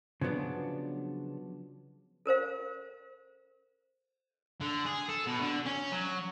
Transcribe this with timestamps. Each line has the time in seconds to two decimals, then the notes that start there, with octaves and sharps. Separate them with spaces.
0.21 C#3 F3 F#3 B3 D4
2.26 A4 A#4 C5 F5
4.61 D3
4.86 G#4
5.09 A4
5.27 B2
5.40 D3
5.66 C#4
5.92 F#3